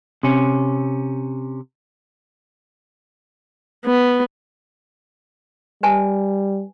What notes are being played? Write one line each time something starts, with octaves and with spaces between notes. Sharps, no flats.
C3 C#4
B3
G3 B4 G#5 A5